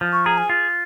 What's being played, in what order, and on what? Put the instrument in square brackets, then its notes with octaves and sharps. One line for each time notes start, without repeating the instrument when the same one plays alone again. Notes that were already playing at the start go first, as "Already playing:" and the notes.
[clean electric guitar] F3
[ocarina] C#6
[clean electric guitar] G#4 [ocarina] A#5
[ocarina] G#5
[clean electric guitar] F4